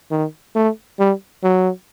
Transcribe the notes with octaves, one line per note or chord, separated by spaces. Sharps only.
D#3
A3
G3
F#3